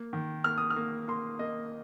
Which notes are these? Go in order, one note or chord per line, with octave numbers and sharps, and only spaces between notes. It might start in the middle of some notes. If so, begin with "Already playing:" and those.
Already playing: A#3
D#3
A#3 F6
D#6
F6
A#3
A#3 C6
A#3 D#5